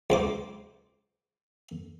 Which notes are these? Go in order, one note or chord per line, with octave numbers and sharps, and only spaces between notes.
C#2 C5 D6